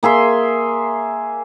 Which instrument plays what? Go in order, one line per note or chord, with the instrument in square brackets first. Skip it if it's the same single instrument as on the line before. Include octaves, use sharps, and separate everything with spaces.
[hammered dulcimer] A#3 G#4 E5 C6